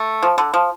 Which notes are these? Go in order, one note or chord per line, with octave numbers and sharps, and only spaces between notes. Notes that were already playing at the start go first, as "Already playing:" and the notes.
Already playing: A3
F3
D3
F3